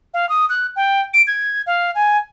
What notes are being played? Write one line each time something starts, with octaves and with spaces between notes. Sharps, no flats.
F5
D#6
F#6
G5
D7
G#6
F5
G#5